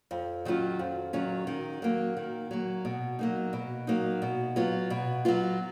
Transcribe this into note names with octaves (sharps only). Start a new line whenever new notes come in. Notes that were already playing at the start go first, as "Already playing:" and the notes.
F2
D#3 F#3 C#4 F4
F2
D#3 F#3 C#4 F4
D#3
F#3 A#3
D#3
F#3 A#3
B2
F#3 A#3 D#4
B2
F#3 A#3 D#4
B2
F#3 B3 F4
B2
F#3 B3 F4